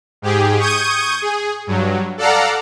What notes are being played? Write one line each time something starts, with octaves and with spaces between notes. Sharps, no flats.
G#2 G4 G#4
C#6 D#6 G6 G#6 D#7
G#4
G2 F#3
A4 D5 F5 F#5 A#5